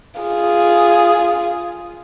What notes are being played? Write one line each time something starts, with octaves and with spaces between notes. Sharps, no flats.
F4 G#4